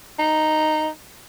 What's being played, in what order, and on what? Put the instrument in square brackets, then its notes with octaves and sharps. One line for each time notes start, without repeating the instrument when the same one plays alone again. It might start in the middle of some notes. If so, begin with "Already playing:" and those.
[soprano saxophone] D#4